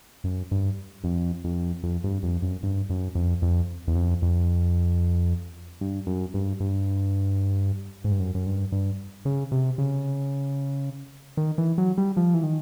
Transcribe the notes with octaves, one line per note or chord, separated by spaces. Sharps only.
F#2
G2
F2
F2
F2
G2
F2
F#2
G2
F#2
F2
F2
E2
F2
F2
G2
F#2
G2
G2
G#2
G2
F#2
F#2
G2
G2
C#3
C3
C#3
D#3
E3
F#3
G3
F3
E3
D#3